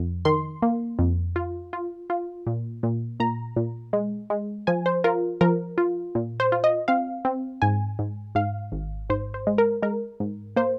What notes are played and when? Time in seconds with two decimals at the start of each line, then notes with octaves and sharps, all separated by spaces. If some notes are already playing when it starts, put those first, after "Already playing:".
Already playing: F2
0.25 D#3 C6
0.62 A#3
0.99 F2
1.36 F4
1.73 F4
2.10 F4
2.47 A#2
2.83 A#2
3.20 A#2 A#5
3.56 A#2
3.93 G#3
4.30 G#3
4.67 F3 G#5
4.86 C5
5.04 F4 A#4
5.41 F3 A#4
5.78 F4
6.15 A#2
6.40 C5
6.52 F4
6.64 D#5
6.88 C4 F5
7.25 C4
7.62 G#2 G#5
7.99 G#2
8.35 G#2 F5
8.72 G#1
9.10 G#2 C5
9.34 C5
9.47 G#3
9.58 A#4
9.82 G#3 A#4
10.20 G#2
10.56 A#3 C5